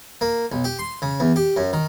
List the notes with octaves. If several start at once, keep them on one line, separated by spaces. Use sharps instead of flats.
A#3
B1
G4
C6
C#3
E2
G4
F#2
D#3